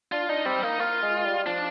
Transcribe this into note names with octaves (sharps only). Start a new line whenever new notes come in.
D4 F4
D4 D#4
G3 C4
A#3 D#4
A#3 F4
G#3
G3
F3 D4